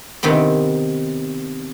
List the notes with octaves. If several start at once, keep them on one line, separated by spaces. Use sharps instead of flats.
C3 D#3 B3 C4